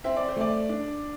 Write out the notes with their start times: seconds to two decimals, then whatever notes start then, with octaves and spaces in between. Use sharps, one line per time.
0.04 C4 E5
0.17 D5
0.29 C5
0.36 A3 D5
0.69 D4